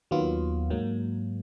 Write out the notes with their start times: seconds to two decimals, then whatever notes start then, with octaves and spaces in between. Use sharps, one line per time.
0.11 D#2 D#3 F#3 B3 F4
0.70 G#2 F#3 A#3